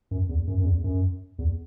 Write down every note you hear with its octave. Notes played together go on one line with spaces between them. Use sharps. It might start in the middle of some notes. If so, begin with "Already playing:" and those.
F#2
E2
F#2
F#2
E2
F#2
E2